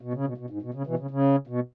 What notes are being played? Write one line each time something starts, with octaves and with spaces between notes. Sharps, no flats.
B2
C#3
B2
B2
G#2
B2
C#3
B2 E3
C#3
C#3
B2